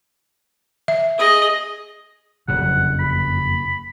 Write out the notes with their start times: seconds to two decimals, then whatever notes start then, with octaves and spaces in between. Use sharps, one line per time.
0.88 E5
1.18 G#4 D#5
2.48 F#1 F2 C3 F#5
2.99 B5